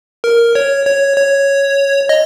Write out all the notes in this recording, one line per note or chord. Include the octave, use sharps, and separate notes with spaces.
A#4
C#5
C#5
C#5
D#5